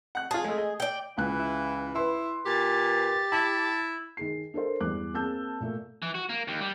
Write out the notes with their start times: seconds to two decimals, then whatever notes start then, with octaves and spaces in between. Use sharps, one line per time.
0.15 F#5 F#6
0.31 F4 G#4 A5
0.45 G#3 A3
0.58 D#5
0.80 D5 G5
1.18 C#2 E3 F#6
1.40 E4
1.96 E4 B4 C6
2.46 A#2 G4 A6
3.32 E4 A5
4.17 D#3 G#4 C7
4.54 D4 A4 A#4 C5
4.80 E2 G2 D6 F#6
5.14 A#3 C4 G#4 A5 E6 G6
5.60 A#2 A3 A#3
6.02 E3
6.15 F#4
6.29 A#3
6.48 D#2
6.61 G3